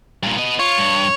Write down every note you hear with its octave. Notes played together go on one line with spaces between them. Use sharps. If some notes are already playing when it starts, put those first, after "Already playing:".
G2 A#2
B3 D#5
F4 C#5
G2